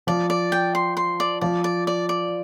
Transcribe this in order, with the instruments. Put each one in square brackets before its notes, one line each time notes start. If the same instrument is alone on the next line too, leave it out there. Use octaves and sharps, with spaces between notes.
[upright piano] F3 [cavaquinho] D5
[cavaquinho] D5
G5
C6
C6
D5
[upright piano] F3 [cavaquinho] D5
[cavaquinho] D5
D5
D5